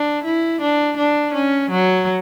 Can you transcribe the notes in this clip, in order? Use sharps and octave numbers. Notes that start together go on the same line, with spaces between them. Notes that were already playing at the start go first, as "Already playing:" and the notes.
Already playing: D4
E4
D4
D4
C#4
F#3